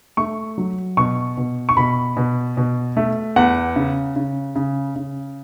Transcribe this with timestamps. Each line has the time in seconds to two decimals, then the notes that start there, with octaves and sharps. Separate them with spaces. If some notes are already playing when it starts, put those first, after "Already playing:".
0.17 A3 C#6
0.58 F#3
0.97 B2 C#6
1.37 B2
1.69 C#6
1.77 B2 B5
2.17 B2
2.57 B2
2.97 A3
3.36 E2 F#5
3.76 C#3
4.16 C#3
4.55 C#3
4.96 C#3